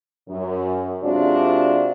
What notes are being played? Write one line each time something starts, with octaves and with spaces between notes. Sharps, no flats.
F#2
C3 G#3 D4 F4 F#4